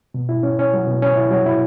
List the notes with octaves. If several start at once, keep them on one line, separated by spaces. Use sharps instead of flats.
B2
E4
C#4
C#4
F#3
B2
C#4
E4
F#3
E4